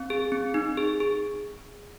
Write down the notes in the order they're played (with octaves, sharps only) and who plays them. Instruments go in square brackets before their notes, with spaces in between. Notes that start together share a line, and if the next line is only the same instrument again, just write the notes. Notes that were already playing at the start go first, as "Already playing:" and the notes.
Already playing: [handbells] C4
G#4
C4
D#4
G#4
G#4